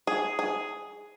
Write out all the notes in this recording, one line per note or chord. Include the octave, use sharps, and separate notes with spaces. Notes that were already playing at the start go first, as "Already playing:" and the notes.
G#4
G#4